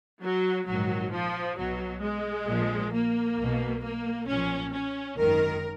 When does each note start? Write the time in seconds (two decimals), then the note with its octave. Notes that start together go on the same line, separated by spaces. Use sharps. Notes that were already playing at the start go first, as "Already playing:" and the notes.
0.22 F#3
0.68 A#1 G#2 D#3 F#3
1.12 F3
1.57 B1 B2 F#3
2.02 G#3
2.48 A#1 A#2 F3
2.93 A#3
3.38 B1 B2
3.83 A#3
4.28 B1 A#2 F3 C#4
4.73 C#4
5.18 G#1 F#2 D#3 A#4